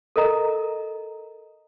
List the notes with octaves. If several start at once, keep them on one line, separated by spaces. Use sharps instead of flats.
A4 A#4 D#5 A#5